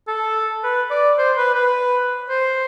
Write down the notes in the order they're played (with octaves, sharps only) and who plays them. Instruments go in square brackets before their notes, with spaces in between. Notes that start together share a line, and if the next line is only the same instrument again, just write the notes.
[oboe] A4
B4
D5
C5
B4
B4
C5